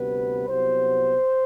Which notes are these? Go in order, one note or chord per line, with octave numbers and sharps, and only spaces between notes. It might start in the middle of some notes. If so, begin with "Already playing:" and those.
Already playing: D2 C3 G3 B3 B4
C2 C3 F#3 B3 C5